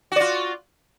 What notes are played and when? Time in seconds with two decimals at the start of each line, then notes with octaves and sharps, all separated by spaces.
0.12 F#4
0.16 D5
0.21 F4